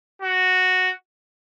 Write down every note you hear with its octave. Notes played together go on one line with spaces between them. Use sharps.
F#4